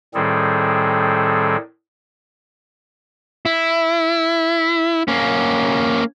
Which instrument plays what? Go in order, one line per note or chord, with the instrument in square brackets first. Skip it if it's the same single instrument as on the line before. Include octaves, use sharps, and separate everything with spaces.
[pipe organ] A2 D#3 G3 C4 G#4 A4
[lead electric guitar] E4
A#3 C#4